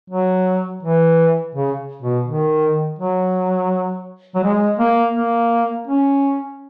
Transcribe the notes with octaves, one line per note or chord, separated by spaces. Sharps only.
F#3
E3
C#3
B2
D#3
F#3
F#3
G#3
A#3
A#3
C#4